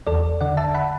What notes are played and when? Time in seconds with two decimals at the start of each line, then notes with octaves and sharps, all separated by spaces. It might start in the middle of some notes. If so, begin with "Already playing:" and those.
0.07 E2 A4 D5
0.41 D3 D5 F#5
0.57 E5 A5
0.74 F#5 B5